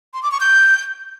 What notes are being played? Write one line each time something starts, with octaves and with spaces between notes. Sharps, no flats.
C6
D6
C#6
G6